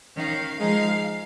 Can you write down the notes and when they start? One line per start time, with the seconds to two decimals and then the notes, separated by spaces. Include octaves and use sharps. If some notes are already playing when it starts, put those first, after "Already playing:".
0.16 D#3 C#4 F5
0.59 F3 G#3 D#4 F5